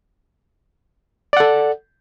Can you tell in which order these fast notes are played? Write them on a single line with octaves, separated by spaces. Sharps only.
D5 F#5 A4